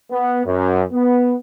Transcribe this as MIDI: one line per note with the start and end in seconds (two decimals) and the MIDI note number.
0.11 0.41 59
0.46 0.83 42
0.92 1.34 59